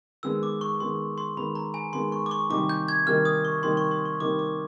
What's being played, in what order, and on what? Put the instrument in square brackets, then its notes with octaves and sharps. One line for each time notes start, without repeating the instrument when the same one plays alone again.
[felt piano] D#3 G#3 B3 [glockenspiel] E6
[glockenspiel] D6
C#6
[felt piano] D#3 G#3 B3 [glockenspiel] C6
[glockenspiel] C6
[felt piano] D#3 G#3 B3 [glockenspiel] B5
[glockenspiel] A#5
G#5
[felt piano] D#3 G#3 B3 [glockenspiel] C6
[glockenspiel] C#6
D6
C#6
[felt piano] C3 D#3 G3 A#3 D#4 [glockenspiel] D6
[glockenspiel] G6
G#6
[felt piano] C3 D#3 G3 A#3 D#4 [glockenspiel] F6
[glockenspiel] D#6
C#6
[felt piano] C3 D#3 G3 A#3 D#4 [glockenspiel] C6
[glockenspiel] C#6
C6
C#6
[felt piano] C3 D#3 G3 A#3 D#4 [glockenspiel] D6
[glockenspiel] D6